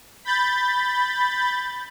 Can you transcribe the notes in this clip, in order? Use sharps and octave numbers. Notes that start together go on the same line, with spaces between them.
B5 G6 A6